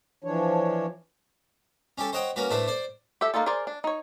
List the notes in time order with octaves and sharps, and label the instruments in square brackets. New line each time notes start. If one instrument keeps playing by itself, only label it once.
[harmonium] E3 F3 D4 C#5
[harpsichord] C#4 G4 A4
C5 C#5 D#5 F#5 G5
A#3 C#4 F#4 B4
A2 A3 D4 B4 C5
C5 D5
[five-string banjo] G4 A4 E5
A#3 C#4 D#4 F4 A4
G#4 A#4 C5 D5
D4
D#4 C#5